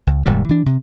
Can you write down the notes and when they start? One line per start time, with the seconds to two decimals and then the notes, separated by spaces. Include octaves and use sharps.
0.07 C#2
0.26 D#1 G#2 C3 G3
0.49 E3 D4
0.66 C3